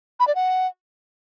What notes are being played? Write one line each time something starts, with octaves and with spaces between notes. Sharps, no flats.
B5
D5
F#5